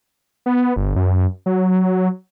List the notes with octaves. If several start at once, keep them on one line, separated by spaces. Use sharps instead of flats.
B3
G1
F#2
F#3